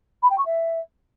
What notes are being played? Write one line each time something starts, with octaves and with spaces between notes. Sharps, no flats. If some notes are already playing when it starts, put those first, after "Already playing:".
B5
G5
C#6
E5